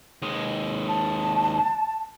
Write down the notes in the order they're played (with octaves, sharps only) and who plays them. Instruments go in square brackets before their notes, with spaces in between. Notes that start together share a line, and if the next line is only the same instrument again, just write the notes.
[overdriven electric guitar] D#2 G#3
[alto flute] A5